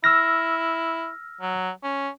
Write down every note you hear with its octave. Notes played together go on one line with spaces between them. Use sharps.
E4 E6 F6 A#6
F#3
C#4